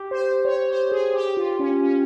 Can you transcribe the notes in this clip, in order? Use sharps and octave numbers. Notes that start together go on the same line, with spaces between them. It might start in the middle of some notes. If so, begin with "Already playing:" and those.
Already playing: G4
C5
C#5
C5
G#4
G4
F4
C#4
C#4